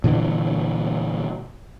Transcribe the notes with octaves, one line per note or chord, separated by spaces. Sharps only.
A#2 D3 E3